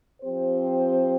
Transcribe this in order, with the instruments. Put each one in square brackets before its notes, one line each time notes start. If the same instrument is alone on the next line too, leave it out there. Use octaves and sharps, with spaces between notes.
[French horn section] F3 C4 G4 C5